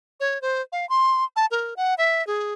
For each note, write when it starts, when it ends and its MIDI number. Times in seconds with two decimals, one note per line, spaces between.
0.20 0.41 73
0.42 0.61 72
0.72 0.88 77
0.89 1.24 84
1.36 1.46 81
1.51 1.74 70
1.77 1.94 78
1.98 2.25 76
2.27 2.54 68